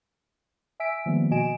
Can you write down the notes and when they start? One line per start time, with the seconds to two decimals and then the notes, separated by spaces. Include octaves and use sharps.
0.80 E5 G#5 E6 B6 D7
1.06 D#3 F3 G3 G#3 A#3 B3
1.31 B2 F#4 D#5 G#5 D7 E7